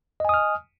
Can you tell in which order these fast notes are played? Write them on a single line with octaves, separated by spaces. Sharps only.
D#5 G#5 D#6 F6